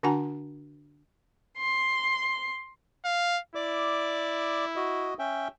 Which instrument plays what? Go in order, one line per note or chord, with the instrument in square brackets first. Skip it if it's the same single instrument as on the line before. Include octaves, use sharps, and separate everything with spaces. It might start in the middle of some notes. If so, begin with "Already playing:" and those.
[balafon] D3 D4 F#4 F#5 G#5 A#5
[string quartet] C6
[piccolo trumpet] F5
[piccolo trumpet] E4 [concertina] D5 D6
[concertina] F#4 D#5
C#4 E5 G5